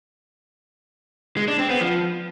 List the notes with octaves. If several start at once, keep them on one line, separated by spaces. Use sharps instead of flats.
G#3
D4
C4
B3
F3